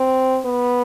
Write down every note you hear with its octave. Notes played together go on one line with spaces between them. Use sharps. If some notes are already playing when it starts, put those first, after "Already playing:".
Already playing: C4
B3